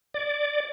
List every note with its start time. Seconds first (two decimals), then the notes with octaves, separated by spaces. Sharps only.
0.14 D5